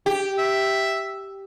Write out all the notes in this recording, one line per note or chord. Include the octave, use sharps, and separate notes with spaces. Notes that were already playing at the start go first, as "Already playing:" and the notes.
G4
E5